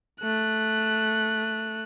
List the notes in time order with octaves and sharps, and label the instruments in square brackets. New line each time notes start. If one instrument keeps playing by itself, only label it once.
[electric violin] A3 F#6